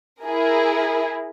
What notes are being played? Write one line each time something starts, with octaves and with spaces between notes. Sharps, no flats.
E4 G#4 A#4